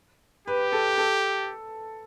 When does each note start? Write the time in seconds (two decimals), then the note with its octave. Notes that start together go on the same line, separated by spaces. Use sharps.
0.47 G4 B4
0.72 A4
0.98 A4